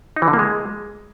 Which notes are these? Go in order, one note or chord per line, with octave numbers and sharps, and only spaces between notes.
D#4
E3
D3
A#3
G#3